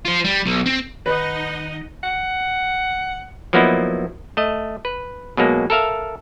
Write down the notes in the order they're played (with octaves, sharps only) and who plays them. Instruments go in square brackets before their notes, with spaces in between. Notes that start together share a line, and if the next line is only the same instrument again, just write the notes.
[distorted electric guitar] F4 C5
G3
B1
C4
[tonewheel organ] D#3 [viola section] D#4 D#5 F#5 [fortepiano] B4
[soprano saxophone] F#5
[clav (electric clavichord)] F3 F#3 A#3 B3 D#4 E4
A3 D#5
B4
B2 F#3 G#3 A#3
A4 A#4 E5 F5